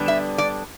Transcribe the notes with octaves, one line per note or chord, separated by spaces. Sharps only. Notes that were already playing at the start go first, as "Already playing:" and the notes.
Already playing: D3 G3 B3 D4
E5
D5